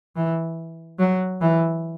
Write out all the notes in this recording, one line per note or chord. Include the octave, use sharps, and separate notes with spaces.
E3
F#3
E3